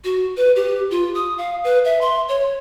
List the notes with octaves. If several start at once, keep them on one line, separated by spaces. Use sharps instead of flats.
F#4
B4
G4
F4
D#6
F5
B4
E5
C6
C#5